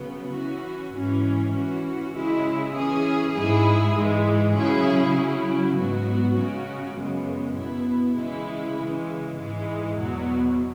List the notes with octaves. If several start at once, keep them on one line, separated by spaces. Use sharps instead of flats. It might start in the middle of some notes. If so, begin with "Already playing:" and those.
Already playing: C#3 F#3 B3
E3 C#4 F#4
G#2 E3 C#4
E3 C#4 F#4
C#3 G#3 E4
E3 C#4 G#4
G#2 G#3 E4 G#4
G#2 E3 G#3
C#3 F#3 C#4 E4 G#4
C#3 F#3 C#4 E4
G#2 F#3 B3 F#4
C#3 G#3 C#4 F#4
F#2 C#3 G#3 B3
B2 B3 E4
C#3 E3 G#3 E4
C#3 E3 G#3
G#2 E3 G#3
E2 B2 F#3